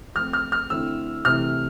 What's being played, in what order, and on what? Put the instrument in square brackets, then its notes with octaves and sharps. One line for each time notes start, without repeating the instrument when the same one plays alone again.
[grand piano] F3 A3 C4 [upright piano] F6
[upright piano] F6
F6
[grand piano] D3 A3 C4 E4 [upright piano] E6
[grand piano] C3 E3 A3 E4 [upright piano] F6